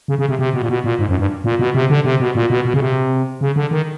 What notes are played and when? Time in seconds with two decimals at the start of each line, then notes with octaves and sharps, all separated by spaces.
0.08 C#3
0.19 C#3
0.29 C3
0.39 C3
0.53 B2
0.62 A#2
0.69 B2
0.84 A#2
0.99 G#2
1.09 F#2
1.19 G2
1.44 A#2
1.59 B2
1.75 C3
1.90 D3
2.05 C3
2.20 B2
2.35 A#2
2.50 B2
2.65 B2
2.74 C#3
2.80 C3
3.41 C#3
3.56 D3
3.71 D#3